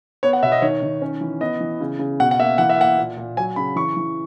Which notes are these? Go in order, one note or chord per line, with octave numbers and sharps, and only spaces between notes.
B3 C#5
F#5
B2 E5
D#5
D#3 C#5
D#3
C#4
E3
B3 D#5
E3
C#3
C#3
B2 F#5
F#5
A#3 E5
E3 F#5
E5
A#3 F#5
A#2
A#2
F#3 G#5
C#3 B5
E3 C#6
E3